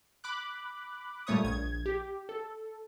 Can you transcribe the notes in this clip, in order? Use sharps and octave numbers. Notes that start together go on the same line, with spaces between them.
B5 D6 F#6
A#2 G3 A3 C#5 C#6 D#6
A#1 G#6
G4
A4